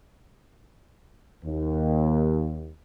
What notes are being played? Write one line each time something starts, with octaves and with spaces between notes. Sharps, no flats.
D#2